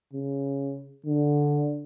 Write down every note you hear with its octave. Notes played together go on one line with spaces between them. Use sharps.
C#3
D3